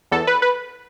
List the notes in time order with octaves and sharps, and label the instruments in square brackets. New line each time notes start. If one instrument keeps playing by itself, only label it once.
[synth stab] E2 A4
B4
B4